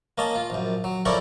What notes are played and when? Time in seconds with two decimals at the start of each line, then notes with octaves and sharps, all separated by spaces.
0.18 A#3 C#4 D#5 A5
0.35 F4
0.50 A#1 F#2
0.84 F#3
1.05 F2 C#4 E4 A#4 D5 C#6